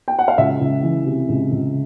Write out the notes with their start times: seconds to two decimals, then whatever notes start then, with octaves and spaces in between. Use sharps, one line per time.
0.08 G5
0.19 F#5
0.28 F5
0.38 C#2 E5
0.61 C#2
0.83 E3
1.06 C3
1.29 C#2
1.52 C#2